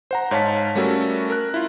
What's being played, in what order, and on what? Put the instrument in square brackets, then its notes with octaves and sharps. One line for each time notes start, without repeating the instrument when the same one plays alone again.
[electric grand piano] C5 F#5 A#5
G#2 C#5 F5 A5 B6
G3 A3 C#4 F#4 A4 A#4
A#4 F#6
E4 F4